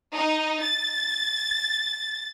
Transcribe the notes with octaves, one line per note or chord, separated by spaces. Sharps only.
D#4
A6